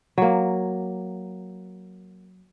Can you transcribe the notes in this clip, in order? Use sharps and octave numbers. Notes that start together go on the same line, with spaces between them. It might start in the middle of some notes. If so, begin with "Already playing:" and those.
F#3 A#3